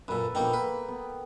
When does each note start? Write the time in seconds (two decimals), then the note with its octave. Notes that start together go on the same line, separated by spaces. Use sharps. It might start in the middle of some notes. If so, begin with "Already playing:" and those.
0.08 F#2 A#2 A4 B4
0.35 A#1 A#3 B3 D#4 G5
0.53 A#3 B4
0.88 B3